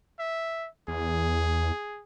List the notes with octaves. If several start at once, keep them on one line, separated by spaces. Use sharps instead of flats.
E5
E2 G#4